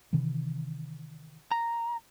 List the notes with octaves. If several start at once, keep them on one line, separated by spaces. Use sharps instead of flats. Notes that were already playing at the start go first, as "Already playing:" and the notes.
C3 D#3 E3
A#5